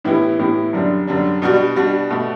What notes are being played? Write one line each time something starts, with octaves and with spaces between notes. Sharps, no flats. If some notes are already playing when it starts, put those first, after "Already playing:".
A2 E3 B3 E4 G4
A2 E3 B3 E4 G4
F#2 D3 G3 D4
F#2 D3 G3 D4
B2 G3 D4 F#4
B2 G3 D4 F#4
B2 A3